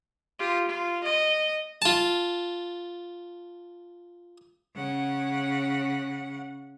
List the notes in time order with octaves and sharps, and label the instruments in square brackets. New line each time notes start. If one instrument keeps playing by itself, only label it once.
[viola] F4 G4
F4
D#5
[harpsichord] F4 A5
[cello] C#3 F#5